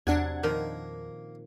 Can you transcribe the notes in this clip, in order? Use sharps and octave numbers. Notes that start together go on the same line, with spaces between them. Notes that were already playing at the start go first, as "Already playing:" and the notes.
E2 C3 F#3 D4 F#5 G#6
A#2 D#3 F3 A#3